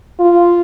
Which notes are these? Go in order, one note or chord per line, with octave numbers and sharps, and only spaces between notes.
F4